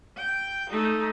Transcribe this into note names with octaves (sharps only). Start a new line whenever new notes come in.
G5
A3 D#4